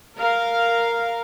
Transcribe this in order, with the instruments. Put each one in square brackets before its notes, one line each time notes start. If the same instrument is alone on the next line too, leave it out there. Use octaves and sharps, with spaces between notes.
[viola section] A#4 F5